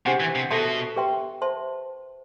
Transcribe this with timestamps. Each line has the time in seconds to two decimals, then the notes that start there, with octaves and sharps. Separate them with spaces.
0.05 C3 D4 G4 C5 F#5 C6
0.20 E3
0.35 C3
0.51 B2 A4 E5 A5 C6
0.96 G4 B4 E5 G5 C6
1.42 C5 E5 A5 C6